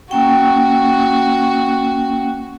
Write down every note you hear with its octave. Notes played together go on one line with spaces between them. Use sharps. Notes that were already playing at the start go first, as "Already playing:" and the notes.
A#3 C#4 F#4 G5